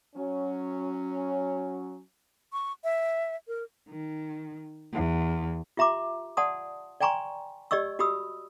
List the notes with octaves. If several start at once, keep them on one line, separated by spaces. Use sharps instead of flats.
F#3 C#4
C#6
E5
A#4
D#3
E2
F4 G4 E5 A#5 C6 D6
D5 F#5 A5 C6 D#6
D5 G5 G#5 A#5 C6 C#6
G4 D5 D#5 C#6 E6
F#4 G4 B5 D#6 E6